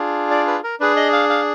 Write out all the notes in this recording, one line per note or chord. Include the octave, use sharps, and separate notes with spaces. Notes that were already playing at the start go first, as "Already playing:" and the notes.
Already playing: D4 F4 G#4
D5
B4
A#4
D4 G#4 B4
D#5
F5
F5